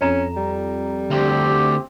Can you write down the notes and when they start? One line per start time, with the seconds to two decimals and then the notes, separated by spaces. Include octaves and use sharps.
0.01 F2 C#4 A#5 E7
0.37 G3
1.11 D2 C4 G4